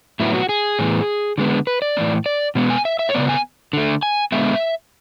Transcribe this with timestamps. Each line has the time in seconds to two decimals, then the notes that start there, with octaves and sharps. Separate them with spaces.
0.20 A2 F#3 B3 E4
0.34 F#4
0.49 G#4
0.79 A2 E3 B3
1.38 D3 G#3 B3
1.67 B4
1.82 D5
1.97 A2 E3 B3
2.26 D5
2.55 B2 G#3 B3
2.70 G#5
2.85 E5
2.99 E5
3.09 C#5
3.14 C#3 G#3 B3 D5
3.29 G#5
3.73 D3 A3
4.03 G#5
4.32 D3 G#3 B3 E5